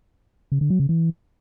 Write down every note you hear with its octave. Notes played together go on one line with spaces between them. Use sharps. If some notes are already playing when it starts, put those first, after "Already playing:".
C#3
D3
F#3
C#3
E3